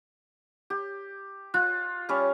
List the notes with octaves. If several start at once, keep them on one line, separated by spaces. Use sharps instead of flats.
G4
F4 F#6
G3 C#4